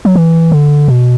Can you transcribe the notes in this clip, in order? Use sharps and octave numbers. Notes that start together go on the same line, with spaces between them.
F#3
E3
D3
B2